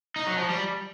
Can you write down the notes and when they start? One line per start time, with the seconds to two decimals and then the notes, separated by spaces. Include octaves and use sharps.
0.16 D#4
0.27 F#3
0.38 F3
0.49 G3